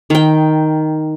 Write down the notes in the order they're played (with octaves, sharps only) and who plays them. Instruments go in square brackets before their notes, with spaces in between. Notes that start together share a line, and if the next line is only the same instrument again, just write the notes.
[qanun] D#3 G5